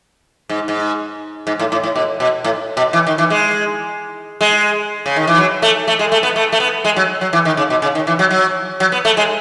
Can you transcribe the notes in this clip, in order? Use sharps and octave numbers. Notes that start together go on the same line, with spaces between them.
G#2
G#2
G#2
A2
A2
A2
B2
B2
A2
B2
E3
D#3
E3
G#3
G#3
C#3
D#3
E3
F#3
A3
A3
G#3
A3
B3
A3
A3
B3
G#3
F#3
F#3
E3
D#3
C#3
B2
C#3
D#3
E3
F#3
F#3
F#3
B3
A3
G#3